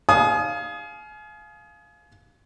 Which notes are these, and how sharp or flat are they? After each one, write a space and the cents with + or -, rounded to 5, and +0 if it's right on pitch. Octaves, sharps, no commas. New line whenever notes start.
F5 +0 G#5 +35 D#6 +0